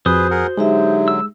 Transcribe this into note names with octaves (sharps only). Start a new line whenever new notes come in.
F2 F#4 G#4 B4 C5 D#6
G#4 A#4 F#5
D3 F#3 G#3 D#4 G4 E5
E6